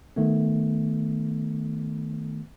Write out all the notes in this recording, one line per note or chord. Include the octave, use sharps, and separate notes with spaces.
D#3 A3 B3